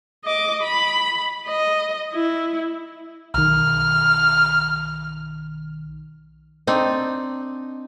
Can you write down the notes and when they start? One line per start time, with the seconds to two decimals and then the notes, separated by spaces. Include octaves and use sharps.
0.24 D#5 D6
0.63 B5
1.47 D#5
2.13 E4
3.34 B1 D#3 F6
6.67 C4 D4 D#4